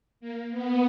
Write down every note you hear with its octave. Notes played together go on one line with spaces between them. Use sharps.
A#3
B3